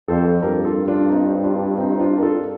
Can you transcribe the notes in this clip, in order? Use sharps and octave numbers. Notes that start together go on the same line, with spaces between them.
F2 A4 C5
G2 G4 A#4
F4 A4
D4 F4
C4 D#4
D4 F4
C4 D#4
D#4
D4 F4
A#4
F4 A4